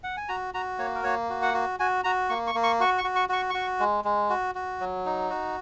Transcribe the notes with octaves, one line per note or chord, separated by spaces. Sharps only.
F#5
G#5
F#4 A#5
F#4 A#5
A#3 C#5
A#4
A#3 C#5
F#4
F#5
F#4
F#4 G#5
F#4 A#5
A#3 C#6
C#6
A#3
C#6
F#4 C#6
C#6
F#4
C#6
F#4 C#6
F#4 C#6
G#3
G#3
F#4
F#4
F#3
D#4
F#4